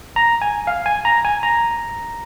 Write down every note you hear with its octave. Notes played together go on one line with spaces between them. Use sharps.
A#5
G#5
F5
G#5
A#5
G#5
A#5